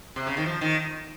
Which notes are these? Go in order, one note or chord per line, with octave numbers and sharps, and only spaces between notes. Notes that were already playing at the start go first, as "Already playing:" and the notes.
C3
C#3
D#3
F3
D#3